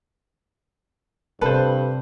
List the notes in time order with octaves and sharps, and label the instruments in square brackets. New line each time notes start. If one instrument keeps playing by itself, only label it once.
[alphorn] G2 [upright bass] C3 [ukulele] A4 [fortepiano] B4 C5